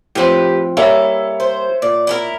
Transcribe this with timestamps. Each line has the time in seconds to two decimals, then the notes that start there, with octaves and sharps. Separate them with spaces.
0.15 A2 F3 C4 G4 B4
0.77 G3 A#3 E4 A4 C#5 E5
1.40 C5
1.82 A#2 D5
2.07 E4 A4 A#4